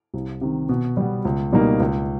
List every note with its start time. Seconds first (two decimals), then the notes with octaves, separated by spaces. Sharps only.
0.14 C2
0.41 C3 D#3
0.69 B2
0.97 G3 B3
1.25 C#2
1.52 B2 G3 A#3 D#4
1.80 C#2